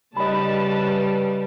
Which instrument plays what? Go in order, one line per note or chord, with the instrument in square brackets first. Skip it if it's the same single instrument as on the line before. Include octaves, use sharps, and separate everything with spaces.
[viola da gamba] C#3 G3 [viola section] B4 A5 [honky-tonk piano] D#5 B5